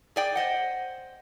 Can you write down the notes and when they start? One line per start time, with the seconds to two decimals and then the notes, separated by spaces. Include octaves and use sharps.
0.16 G#4 D5 G5
0.35 C5 D#5 F#5